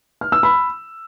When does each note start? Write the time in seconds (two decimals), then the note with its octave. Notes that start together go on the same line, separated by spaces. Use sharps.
0.21 F6
0.32 E6
0.43 B5